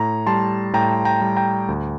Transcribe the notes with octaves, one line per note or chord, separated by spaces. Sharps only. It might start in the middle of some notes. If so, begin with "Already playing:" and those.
Already playing: A2 A#5
G3 A5 C6
A2 G5 A#5
G5 A#5
G3
G5 A#5
D2